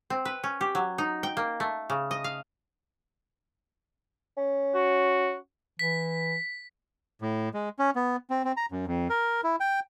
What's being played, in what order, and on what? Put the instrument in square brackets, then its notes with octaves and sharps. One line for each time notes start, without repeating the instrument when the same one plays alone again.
[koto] C4
B4
C#4
G4
F#3
D#4
G5
A#3
A3
C#3
D#5
F5
[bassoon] C#4
[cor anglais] F#4
[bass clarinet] E3 [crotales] B6
[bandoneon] A2
G#3
C#4
B3
C4
C4
A#5
F#2
F2
A#4
E4
G5